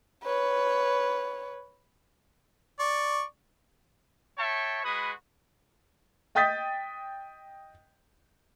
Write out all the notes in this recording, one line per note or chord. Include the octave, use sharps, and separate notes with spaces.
B4 C#5
D5 C#6
C#5 E5 G5 A5 C#6
G#3 F#4 B4 B5 D#6
D#5 G5 D#6 G6 A6 B6